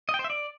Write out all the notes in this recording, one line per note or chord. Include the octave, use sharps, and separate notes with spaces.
D#5
G5
C5
E5
D5